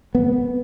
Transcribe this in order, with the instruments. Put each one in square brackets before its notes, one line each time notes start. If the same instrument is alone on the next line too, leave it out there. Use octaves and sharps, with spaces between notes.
[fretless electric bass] B3